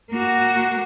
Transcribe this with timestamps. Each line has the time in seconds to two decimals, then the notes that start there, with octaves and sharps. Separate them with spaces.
0.11 A#3 F#4